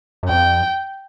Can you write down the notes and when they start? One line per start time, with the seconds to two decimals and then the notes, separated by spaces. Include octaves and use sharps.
0.23 F#2
0.29 F2 G5